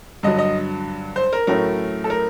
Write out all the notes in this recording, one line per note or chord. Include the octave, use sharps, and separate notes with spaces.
G2 D3 F#3 D#5
D#5
C5
A#4
A2 F#3 A3 C#4 A#4
A4
A#4